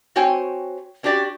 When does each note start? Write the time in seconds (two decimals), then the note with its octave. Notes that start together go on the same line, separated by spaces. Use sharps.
0.16 C4 F#4 C5 C#5 G5 G#5
1.03 C#4 D4 F#4 G4 D5